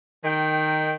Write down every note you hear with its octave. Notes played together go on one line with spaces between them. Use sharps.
D#3 G5